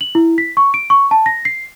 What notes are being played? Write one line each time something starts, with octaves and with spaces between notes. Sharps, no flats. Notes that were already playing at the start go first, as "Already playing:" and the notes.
F#7
E4
B6
C#6
D7
C#6
A5
A#6
C7